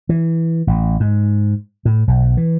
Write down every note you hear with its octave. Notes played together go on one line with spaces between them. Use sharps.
E3
A1
G#2
A2
B1
E3